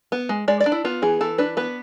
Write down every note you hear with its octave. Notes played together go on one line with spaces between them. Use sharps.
B3
G#3
G#3 D5
D5
D4
E4
B3 F4
E3 G#4
E3 A4
D4 B4
B3 B4